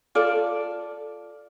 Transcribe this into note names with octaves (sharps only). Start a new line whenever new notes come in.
F4 A4 D5